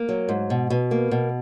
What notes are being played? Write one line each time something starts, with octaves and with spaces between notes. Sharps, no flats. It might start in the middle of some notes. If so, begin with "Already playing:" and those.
Already playing: A#3
F#3
G#2
B2
B2
A#3
B2